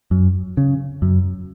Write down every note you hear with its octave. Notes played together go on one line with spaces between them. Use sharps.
F#2
C#3
F#2